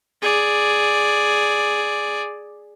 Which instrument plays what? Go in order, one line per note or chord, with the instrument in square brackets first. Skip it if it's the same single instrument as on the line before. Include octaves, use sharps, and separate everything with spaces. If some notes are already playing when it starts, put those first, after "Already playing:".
[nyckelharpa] G#4 D5